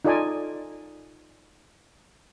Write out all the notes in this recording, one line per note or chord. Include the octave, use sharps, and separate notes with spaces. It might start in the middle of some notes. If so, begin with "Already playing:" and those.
D#4 F4 A4 D5 D#5 G#5